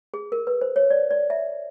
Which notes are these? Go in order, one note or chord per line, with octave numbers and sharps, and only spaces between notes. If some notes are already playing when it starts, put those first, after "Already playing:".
G#4
A#4
B4
C5
C#5
D5
D5
E5